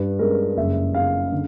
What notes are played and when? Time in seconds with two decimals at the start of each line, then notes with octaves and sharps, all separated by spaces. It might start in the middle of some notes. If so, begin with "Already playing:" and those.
Already playing: G2 B4
0.19 G#3 A#4
0.57 F#1 E5
0.94 C#3 F5
1.32 D3